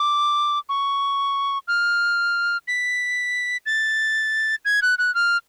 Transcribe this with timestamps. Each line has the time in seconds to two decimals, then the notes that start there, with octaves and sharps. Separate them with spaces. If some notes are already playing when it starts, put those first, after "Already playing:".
Already playing: D6
0.69 C#6
1.68 F6
2.68 B6
3.66 A6
4.65 G#6
4.82 F#6
4.99 F#6
5.15 F6